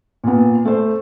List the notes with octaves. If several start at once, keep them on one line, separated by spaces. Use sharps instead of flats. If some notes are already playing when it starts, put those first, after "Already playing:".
A#2 B3
A3 C5